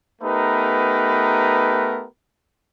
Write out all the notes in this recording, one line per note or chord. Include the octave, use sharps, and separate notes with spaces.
A3 B3 D#4 G4 A#4 B4